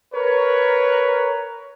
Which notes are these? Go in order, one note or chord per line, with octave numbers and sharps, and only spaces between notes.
A#4 B4 C#5